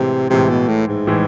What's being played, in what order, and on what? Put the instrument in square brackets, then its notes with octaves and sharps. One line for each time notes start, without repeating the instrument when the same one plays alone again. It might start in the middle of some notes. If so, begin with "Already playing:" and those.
Already playing: [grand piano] A2 E3 G#3 [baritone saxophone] C3
[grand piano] A2 E3 G#3 [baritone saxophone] C3
[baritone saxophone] B2
A2
G#2
[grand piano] A2 E3 G#3